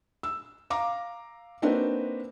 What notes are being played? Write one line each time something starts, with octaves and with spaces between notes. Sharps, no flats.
E6
F5 A#5 D6
A#3 C4 D4 D#4 F#4 B4